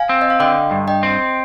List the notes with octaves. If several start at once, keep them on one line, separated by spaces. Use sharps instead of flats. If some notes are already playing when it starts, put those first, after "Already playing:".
Already playing: F5 G#5
C4
D#5
F5
D3 D#5 G5
G2
D#5 G5
C4